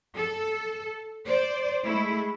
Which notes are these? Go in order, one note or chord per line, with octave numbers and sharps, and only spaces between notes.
A4
C5 D5
G#3 A3 E4